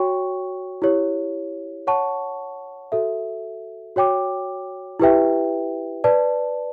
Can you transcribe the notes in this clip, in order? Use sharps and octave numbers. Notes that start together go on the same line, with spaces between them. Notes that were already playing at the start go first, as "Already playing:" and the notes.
Already playing: F#4 C#5 G5 C#6
E4 G4 C#5
C#5 F#5 A5 C#6
F#4 A4 E5
F#4 C#5 G5 D6
E4 G4 B4 E5 G5
B4 D5 A5